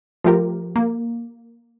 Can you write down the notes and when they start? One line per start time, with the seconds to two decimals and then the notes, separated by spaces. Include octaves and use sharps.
0.24 F3 A3 F4 G4 A#4
0.76 A#3